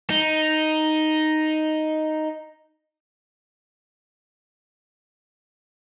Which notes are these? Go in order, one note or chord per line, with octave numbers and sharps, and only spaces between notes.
D#4